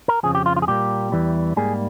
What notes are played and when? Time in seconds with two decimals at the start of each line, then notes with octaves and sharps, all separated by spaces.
0.08 A#4
0.23 F2 C#3 F3 G#4
0.35 G4
0.46 F4
0.56 F4
0.62 G#4
0.67 A#2 G3 A#3 G4
1.12 E2 E3 G3
1.56 G#2 G3 A#3 G#4